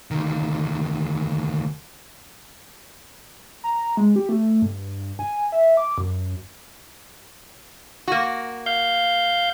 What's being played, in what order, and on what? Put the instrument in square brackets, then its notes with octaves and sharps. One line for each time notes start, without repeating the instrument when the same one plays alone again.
[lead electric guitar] D2 D#3
[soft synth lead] A#5
G#3
G4
A3
G2
G#5
E5
D6
F#2
[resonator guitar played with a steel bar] A#3 F#4
[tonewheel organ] F5 G6